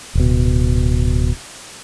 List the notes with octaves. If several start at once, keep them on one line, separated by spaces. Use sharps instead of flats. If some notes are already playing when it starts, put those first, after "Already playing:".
D1 B2